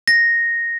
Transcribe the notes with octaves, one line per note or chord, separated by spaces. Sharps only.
A#6